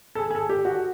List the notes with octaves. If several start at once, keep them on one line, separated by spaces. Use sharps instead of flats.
A4
G#4
G#4
A4
G4
F#4